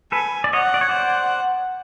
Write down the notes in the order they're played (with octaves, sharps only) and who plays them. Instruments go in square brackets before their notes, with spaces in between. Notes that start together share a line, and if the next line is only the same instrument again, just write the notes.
[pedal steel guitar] A4 B4 [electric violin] G#5
[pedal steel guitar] D5
[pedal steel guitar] C#5 D#5 [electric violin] F#5
[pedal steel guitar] D5
C#5
C5 D5